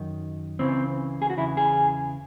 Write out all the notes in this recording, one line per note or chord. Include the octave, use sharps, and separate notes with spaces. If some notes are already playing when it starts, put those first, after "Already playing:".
Already playing: F#2 D#3
C#2 C#3 E3 C4
G#4
F#4
E2 C#3 E3 E4
G#4